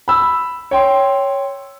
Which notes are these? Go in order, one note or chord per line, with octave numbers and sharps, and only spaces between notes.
B5 E6
C#5 G5 C6